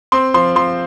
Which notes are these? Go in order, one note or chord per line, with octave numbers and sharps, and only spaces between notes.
C4 C6
F3 C6
F3 C6